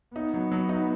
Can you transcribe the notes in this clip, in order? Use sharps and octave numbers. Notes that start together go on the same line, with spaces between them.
B3 D#4
F#3
F#3
D#4